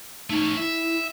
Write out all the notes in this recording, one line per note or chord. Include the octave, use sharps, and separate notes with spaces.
A3 C#4 D#4
E4 E5